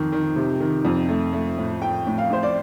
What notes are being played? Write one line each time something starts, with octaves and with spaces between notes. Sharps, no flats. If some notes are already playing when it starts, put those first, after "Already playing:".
Already playing: F2 D#3
D#3
C3
D#3
F2
A3
A3
A2
A2 G5
A2
F5
A2 C5
D5